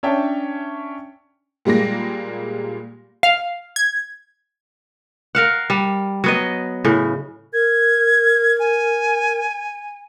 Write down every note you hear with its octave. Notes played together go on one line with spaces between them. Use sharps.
C#4 D4 C#5 E5 G5 A5
A#2 G3 G#3 A#3 A#6
F5
G#6
A#4 F5 F#5
G3
F#3 B3 D#5
A2 C#3
A#4 G#6
G#5